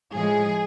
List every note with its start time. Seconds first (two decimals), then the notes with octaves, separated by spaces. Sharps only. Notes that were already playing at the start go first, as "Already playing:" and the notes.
0.13 A2 F3 G#3 G#4